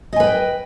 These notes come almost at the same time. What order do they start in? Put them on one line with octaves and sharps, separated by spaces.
D#5 G#5 B4 G5